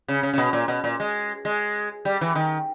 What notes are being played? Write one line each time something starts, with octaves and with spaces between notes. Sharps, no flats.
C#3
C#3
C#3
B2
A#2
B2
A#2
G#3
G#3
G3
E3
D#3